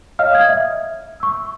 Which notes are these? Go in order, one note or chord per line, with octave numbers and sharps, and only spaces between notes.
C#5 D#5 F5 F6
D#6 G#6
E5
C#6 E6